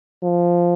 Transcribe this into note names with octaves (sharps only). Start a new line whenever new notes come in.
F3